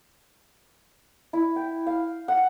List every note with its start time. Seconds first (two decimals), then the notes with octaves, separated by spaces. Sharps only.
1.33 E4
1.56 G5
1.86 F5
2.28 F#5